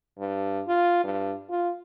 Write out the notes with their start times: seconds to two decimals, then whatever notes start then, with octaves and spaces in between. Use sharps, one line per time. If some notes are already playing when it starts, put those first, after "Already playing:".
0.19 G2
0.68 F4
1.04 G2
1.50 F4